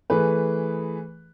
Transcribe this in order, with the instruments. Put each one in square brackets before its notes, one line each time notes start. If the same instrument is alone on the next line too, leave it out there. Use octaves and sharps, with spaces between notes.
[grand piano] E3 A3 G#4 B4